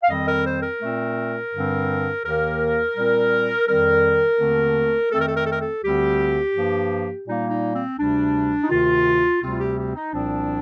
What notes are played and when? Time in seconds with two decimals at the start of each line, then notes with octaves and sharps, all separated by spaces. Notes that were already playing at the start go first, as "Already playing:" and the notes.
0.03 F5
0.09 F2 D#3 G3 C4 D#5
0.27 A#4
0.44 C5
0.62 A#4
0.81 A#2 A3 C4
1.53 G2 D3 G3 C4
2.24 D#2 D#3 A#3 A#4
2.96 A#2 G3 C4
3.67 F2 D#3 G3 C4 A#4
4.38 D#2 D3 A3 C4
5.11 F2 D#3 A3 C4 A4
5.19 A#4
5.27 A4
5.35 A#4
5.44 A4
5.52 A#4
5.61 A4
5.83 D2 D3 G3 C4 G4
6.53 G2 F3 A#3
7.26 A#2 G3 A#3 D#4
7.50 D#4
7.74 C4
7.97 D2 C3 G3 D4
8.62 D#4
8.69 D2 C3 D#3 F4
9.41 D2 C3 G3 C4 F4
9.58 G4
9.77 G4
9.95 D#4
10.12 C2 A#2 F3 C4 D4